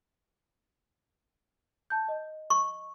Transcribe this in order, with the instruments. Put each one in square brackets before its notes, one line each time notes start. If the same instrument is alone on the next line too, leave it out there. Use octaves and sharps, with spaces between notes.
[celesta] A5 G6
D#5
[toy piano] C#6